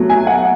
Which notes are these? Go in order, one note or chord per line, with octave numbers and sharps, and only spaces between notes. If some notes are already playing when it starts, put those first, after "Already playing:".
Already playing: B2 F#3 A3
G#5
F#5